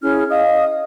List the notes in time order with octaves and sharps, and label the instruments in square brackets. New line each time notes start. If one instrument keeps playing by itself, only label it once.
[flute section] C#4 E4 G#4 F6
D#5 F5 D#6